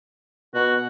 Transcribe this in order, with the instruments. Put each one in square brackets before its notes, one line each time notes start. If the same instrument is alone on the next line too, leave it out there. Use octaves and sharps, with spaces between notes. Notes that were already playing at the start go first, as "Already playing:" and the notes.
[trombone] B2 [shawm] F#4